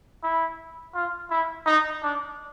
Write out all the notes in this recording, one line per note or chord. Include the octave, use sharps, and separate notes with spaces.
E4
F4
E4
D#4
D4